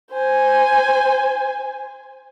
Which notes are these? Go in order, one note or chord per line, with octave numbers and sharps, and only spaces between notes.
C5 G#5